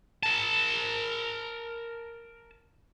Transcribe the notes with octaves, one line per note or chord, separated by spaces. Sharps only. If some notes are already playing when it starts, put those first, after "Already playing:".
A#4 A5